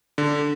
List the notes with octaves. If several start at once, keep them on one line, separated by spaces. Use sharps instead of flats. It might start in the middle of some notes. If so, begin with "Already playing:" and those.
D3